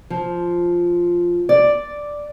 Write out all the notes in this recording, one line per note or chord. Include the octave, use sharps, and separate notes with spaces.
F3
D5